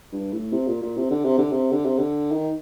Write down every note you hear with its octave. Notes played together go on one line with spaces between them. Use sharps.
G2
A2
C3
A#2
A#2
C3
D3
C3
D3
C3
D3
C3
D3
D#3